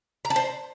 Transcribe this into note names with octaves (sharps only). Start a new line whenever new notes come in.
A#5
A5
C5